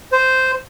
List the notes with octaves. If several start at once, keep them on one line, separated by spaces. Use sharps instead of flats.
C5